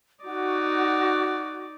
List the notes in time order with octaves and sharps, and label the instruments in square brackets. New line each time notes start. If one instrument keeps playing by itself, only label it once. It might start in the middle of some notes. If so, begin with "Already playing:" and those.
[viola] D#4 D5 [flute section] F#4